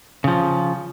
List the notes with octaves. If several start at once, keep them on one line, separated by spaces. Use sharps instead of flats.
C#3 F3